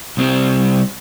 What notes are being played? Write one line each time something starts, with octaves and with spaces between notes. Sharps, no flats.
C2 C4